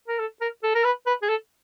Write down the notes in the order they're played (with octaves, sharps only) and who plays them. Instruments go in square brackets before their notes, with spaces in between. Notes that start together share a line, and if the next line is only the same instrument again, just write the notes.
[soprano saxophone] A#4
A4
A#4
A4
A#4
B4
B4
G#4
A4